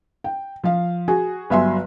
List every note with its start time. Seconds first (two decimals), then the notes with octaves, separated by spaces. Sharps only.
0.24 G5
0.64 F3 F5
1.08 F#4 G#4 G#5
1.50 G1 F#3 E5 G#5 C6